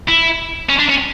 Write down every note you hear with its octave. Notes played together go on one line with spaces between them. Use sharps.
E4
C#4
D4
C#4